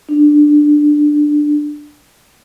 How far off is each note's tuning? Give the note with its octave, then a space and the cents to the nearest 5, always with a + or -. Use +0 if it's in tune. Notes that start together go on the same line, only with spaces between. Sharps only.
D4 +10